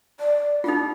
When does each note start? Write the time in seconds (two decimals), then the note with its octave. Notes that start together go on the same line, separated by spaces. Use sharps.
0.19 D5
0.64 D4 D#4 F4